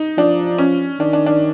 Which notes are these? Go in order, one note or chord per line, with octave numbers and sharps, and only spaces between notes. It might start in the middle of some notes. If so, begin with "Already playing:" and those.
Already playing: D#4
F3 D4
C#4
D#3 D4
D4
D4